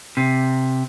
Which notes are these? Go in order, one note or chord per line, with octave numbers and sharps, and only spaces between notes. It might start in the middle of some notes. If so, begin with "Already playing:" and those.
C3